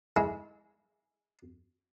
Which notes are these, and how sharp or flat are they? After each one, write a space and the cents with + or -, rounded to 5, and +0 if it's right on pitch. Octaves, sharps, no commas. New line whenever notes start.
G#3 +0 E4 -35